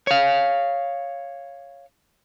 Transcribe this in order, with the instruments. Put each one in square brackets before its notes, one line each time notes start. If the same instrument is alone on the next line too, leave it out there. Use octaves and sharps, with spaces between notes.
[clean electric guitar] C#5 F5